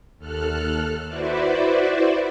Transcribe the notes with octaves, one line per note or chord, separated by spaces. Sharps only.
D#2 A4 F6 F#6
E4 F#4 B4 C5 D5 E5